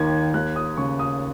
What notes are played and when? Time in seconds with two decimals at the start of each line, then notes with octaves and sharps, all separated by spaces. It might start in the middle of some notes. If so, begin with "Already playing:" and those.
Already playing: D#2 D#3 G#6
0.34 D#2 F#6
0.56 D#6
0.77 C#3 C#6
0.99 D#6